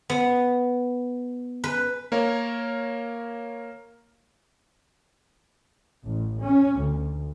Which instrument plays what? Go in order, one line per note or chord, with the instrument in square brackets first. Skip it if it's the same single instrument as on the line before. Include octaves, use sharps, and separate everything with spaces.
[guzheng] B3
B4
[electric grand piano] A#3 A#4 C#5 F5
[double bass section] A1
C#4
D2